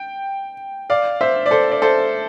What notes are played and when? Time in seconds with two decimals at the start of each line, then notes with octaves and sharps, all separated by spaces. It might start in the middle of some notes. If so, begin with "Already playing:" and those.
Already playing: G5
0.90 D5 F5
1.21 C5 E5
1.46 D5
1.51 A4 C5
1.72 D5
1.82 A4 C5